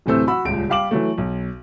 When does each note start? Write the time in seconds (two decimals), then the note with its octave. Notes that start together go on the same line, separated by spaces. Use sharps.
0.06 D1 C3 E3 A3 C5 E6
0.27 F#4 B5 E6
0.45 D#1 C#2 D7
0.69 G3 G4 F5 D6 F#7
0.91 E3 F#3 A3
1.18 B1